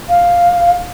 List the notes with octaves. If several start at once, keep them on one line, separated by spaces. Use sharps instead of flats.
F5